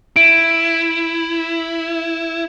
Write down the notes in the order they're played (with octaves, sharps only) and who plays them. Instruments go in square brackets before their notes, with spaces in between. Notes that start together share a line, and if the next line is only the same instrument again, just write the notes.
[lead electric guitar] E4 [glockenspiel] D7